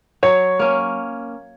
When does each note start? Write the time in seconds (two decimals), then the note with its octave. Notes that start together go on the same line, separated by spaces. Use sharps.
0.23 F#3 C#5
0.59 A#3 C#4